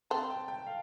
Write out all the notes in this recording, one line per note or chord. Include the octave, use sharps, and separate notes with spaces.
C4 A5
G5
G5
F5